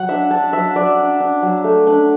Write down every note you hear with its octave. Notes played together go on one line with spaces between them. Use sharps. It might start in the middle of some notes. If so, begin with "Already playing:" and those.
Already playing: F#3 F#5
D4 E5
D4 A5
F#3 E5
F#3 D5
D4
D4
F#3
A3
D4